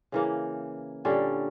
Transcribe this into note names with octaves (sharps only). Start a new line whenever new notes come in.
C#3 E3 A#3
A#2 D3 G3 C#4